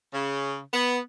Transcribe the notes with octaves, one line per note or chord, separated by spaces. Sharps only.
C#3
B3